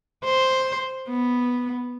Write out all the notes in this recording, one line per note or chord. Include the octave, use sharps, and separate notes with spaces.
C5
B3